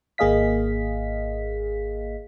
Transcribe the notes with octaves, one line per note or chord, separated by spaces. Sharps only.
G#1 A#3 G#4 D#5 F5 B6